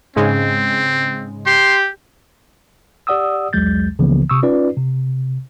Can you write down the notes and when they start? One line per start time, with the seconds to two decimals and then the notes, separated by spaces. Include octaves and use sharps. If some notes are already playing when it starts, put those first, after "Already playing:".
0.16 G#2 C#3 G#3 C4
1.46 G4 C6
3.07 G4 D5 F#5 D#6 E6
3.53 B1 E2 F#3 G#3 G6 A6
3.99 C#2 C#3 E3 F3 A#3 B3
4.30 C3 C#6 D#6 E6
4.43 C#4 D#4 F4 B4 D5
4.77 C3